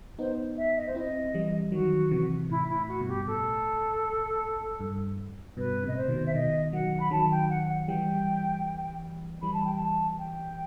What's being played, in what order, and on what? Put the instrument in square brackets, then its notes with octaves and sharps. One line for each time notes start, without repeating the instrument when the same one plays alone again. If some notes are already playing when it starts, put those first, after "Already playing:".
[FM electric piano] B3 D#4 [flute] C5
[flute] E5
D#5
C5
[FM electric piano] C4 E4 [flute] D#5
[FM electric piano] E3 G3
[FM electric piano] D#3 F#3 [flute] F#4
[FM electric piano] C3 E3
[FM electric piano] A2 [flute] E4
[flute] E4
[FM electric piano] A2
[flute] F#4
[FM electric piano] G2 B2
[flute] G4
[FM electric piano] B2
[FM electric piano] A2 [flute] A4
[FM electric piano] G2
[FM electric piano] G2 B2 [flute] B4
[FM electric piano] A2 C3 [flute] D#5
[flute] C5
[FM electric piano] B2 D#3
[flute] E5
[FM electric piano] B2 D#3 [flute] D#5
[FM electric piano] D#3 F#3 [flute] F#5
[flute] B5
[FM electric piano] D#3 F#3 [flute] A5
[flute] G5
F#5
F#5
[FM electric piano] E3 G3 [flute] G5
[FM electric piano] E3 G3 [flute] B5
[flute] A5
G5
A5
G5